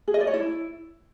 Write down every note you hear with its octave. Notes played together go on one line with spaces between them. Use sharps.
G#4
D#5
D5
C#5
E4